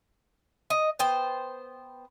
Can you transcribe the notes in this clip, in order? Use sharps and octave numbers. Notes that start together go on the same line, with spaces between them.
D#5
B3 C5 G5